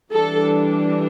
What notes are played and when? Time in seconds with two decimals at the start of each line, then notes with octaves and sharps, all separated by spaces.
0.13 E3 G3 D4 A4